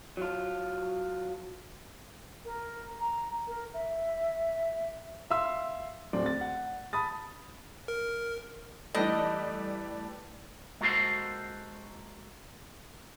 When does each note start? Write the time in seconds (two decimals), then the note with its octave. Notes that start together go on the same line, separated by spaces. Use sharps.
0.17 F#3 F4
2.45 A#4
3.00 A#5
3.48 A#4
3.74 E5
5.30 E5 F5 C6 E6
6.13 D1 C4 D5
6.26 A6
6.41 F#5
6.93 A5 B5 D#6 A6
7.88 A#4
8.95 E3 G3 A3 B4 D#5 G5 A5
10.81 G#3 A#3 F#4 A4 C5 C6